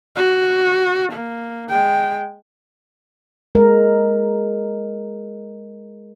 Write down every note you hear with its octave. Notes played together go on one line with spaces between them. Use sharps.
F#4
A#3
G#3 G5
G#3 A#4